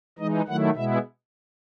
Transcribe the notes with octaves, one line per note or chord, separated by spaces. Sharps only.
E3 G#3 D#4 D#5
D#3 F#3 A3 E4 F#5
B2 G#3 B3 E4 E5